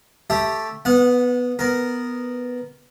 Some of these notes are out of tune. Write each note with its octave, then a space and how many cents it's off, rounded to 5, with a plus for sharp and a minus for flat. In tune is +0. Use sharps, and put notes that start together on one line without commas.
A3 +0 G4 +0 E5 +0
B3 +0 F#5 -30
B3 +0 A#4 +0